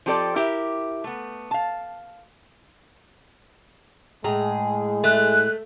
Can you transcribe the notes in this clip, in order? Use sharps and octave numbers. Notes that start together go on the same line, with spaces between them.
F3 C4 G4 A4 A#4 D5
E4 G4 A#4 E5
A3 B3
F5 A5
A2 G#3 G#4 A#5
A3 F#6